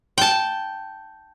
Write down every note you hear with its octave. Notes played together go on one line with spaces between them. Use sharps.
G5 A5